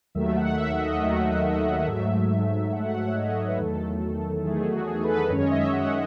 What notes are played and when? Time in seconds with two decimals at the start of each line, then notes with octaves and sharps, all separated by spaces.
0.15 D#2 D#3 F#3 A3 E5
0.36 F#5
0.58 E5
0.79 D#5
1.01 D#2 D#3 F#3 A3
1.87 G#2 F#3 A3 E5
2.72 G#2 F#3 A3 F#5
2.94 F#5
3.07 C#5
3.16 D#5
3.48 B4
3.58 E2 D#3 F#3 A3 A4
4.44 E2 D#3 F#3 A3 G#4
4.65 F#4
4.87 G#4
5.04 B4
5.09 A4
5.25 D#5
5.30 F#2 D#3 G#3 C#4 C#5
5.42 D#5
5.51 E5
5.68 E5
5.73 F#5